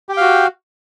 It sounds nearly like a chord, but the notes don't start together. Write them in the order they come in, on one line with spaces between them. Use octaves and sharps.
G4 G5 F5 F#4